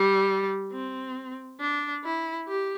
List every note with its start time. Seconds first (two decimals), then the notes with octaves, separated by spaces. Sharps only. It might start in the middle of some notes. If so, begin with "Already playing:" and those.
Already playing: G3
0.72 C4
1.60 D4
2.04 E4
2.47 G4